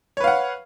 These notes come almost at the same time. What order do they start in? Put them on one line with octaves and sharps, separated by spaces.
C#5 B4 F5 F#5